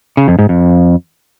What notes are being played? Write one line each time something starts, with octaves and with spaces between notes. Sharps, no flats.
C#3
F2
G#2
F2